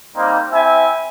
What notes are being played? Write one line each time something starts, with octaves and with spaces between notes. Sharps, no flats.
G3 A#3 C4 D#4
C4 E4 E5 G#5